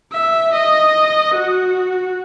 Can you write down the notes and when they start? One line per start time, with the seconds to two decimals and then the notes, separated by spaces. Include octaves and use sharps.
0.12 E5
0.52 D#5
1.34 F#4